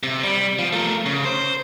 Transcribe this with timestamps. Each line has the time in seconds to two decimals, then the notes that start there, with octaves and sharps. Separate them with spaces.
0.03 C3
0.24 G3
0.59 F3
0.73 A3 A#4
1.06 C#3
1.25 C5